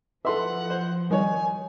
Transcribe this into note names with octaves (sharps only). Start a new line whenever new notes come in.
F3 A4 B4 E5 F#5 C6
C5
D#3 G3 C#5 G#5